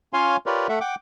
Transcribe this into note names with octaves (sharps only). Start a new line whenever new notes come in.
C#4 F4 C#5 F5 G#5 C6
F4 G4 A#4 B4 C#5 D5
A3 A4 E5 F#5
F#5 G5 D6